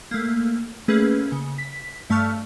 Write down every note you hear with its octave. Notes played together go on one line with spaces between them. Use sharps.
A3 A#3
A3 A#3 C#4 G#4 B4
C#3
B6
G2 A3 A5 C#6 F6